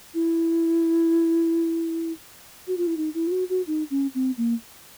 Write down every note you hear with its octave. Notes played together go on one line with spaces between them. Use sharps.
E4
F#4
F4
E4
D#4
E4
F4
F#4
F#4
D#4
C#4
C4
A#3